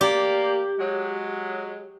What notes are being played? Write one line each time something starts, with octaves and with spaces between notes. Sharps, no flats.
A#3 G4 D5
F#3 G#3